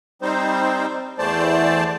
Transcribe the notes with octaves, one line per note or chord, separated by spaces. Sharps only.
G3 C4 D#4 C5
E2 E3 A3 C5 D5 A5